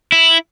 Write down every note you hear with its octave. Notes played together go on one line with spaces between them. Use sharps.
E4